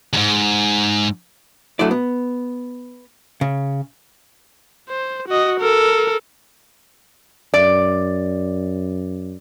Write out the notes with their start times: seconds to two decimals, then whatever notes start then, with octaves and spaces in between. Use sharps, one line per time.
0.13 E2 G#2
1.79 B1 F#3 A3 D4 E4 D5
1.91 B3
3.41 C#3
4.89 C5
5.28 F#4 D#5
5.60 A4 A#4
7.54 F#2 D5